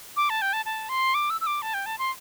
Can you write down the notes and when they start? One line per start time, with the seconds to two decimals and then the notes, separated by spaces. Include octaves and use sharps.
0.17 D6
0.30 A5
0.42 G5
0.53 A5
0.66 A5
0.89 C6
1.14 D6
1.30 E6
1.41 E6
1.47 D6
1.62 A5
1.74 G5
1.86 A5
1.99 C6